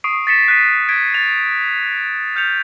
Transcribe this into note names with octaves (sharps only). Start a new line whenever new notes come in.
C#6 D#6 C7 D7
A6 B6 C#7 E7
F#6 B6 D#7
G#6 B6 D7
A6 D#7 F7
F6 G6 C#7 F7